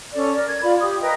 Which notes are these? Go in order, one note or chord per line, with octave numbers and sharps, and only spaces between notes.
C#4 A4 D5
A#4 D5
G#6
F4 D5 B5
G4 D#6
A#4 B4 D#5 G5